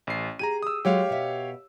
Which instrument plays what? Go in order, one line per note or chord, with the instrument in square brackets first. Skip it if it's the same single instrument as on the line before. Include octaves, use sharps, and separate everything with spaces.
[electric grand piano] A1 C7
[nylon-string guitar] G4 G#4 [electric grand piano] A#5 D#7
[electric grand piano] D#6 E6
[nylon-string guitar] F#3 G#3 F#4 [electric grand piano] G4 C#5 F5
[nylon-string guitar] B2 E5